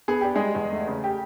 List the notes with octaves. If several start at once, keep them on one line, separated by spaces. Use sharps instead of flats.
B3 G#4
D4 G4
G3 G#3 G#4
E2
A3
C#3
G4